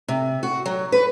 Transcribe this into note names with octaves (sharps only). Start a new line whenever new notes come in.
C3
F#4
F#3
B4